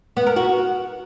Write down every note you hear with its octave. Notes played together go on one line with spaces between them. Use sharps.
B3
A#4
F#4